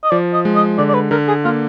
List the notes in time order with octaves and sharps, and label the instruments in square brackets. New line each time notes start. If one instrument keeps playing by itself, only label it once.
[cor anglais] D#5
[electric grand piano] F3 [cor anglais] D5
[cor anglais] D#5
[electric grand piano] G#3
[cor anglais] D#5
[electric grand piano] D3 [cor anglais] D5
[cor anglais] D5
B4
[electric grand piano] D3 [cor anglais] A#4
[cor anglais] G#4
[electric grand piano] A#3 [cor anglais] F4